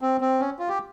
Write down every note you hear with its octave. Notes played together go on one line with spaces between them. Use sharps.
C4
C4
C#4
F4
G4